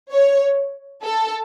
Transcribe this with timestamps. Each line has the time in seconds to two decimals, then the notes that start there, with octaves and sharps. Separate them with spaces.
0.12 C#5
1.03 A4